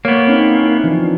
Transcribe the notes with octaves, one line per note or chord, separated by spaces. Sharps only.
A#3 B3 C#5
C4 C#4 D#4
E4
E3 F3 D4